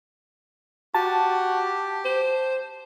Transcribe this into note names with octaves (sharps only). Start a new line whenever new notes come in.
F#4 G4 A5
C5